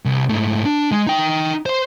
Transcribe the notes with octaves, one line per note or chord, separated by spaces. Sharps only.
C2
G#2 A3
D4
G#3
D#4 G5
C5 C6